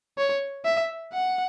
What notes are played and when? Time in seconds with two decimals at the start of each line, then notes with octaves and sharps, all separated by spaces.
0.18 C#5
0.65 E5
1.13 F#5